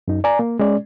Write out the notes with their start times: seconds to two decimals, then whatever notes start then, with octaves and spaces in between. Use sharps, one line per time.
0.08 F#2 D#4
0.24 D5 G#5 A#5
0.39 A#3
0.59 G#3 C#4 D5